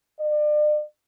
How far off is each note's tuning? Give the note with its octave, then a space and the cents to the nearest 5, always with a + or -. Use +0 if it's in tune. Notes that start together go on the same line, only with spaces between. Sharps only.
D5 +40